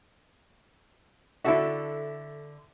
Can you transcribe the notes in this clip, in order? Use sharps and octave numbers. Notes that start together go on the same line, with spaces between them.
D3 E4 F#4 A4 E5